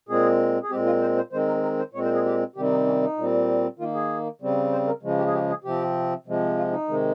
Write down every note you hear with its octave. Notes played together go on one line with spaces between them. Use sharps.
A#2 G#3 C4 G#4
G#4
A#2 G#3 C4 G4
F4
C5
C5
D#3 G#3 C4 C5
A#4
A#4
C5
A#2 G#3 C4 C#5
C5
G#4
G4
C3 D#3 G3 C4 G4
D#4
C#4
D#4
A#2 G3 C4
D#3 A#3 F4
G#4
C#3 G3 C4
C5
A#4
C#3 F3 G#3
G4
G#4
G4
G#4
C3 F3 C4 G4
C3 F3 G#3
F4
D#4
C3 D#3 G#3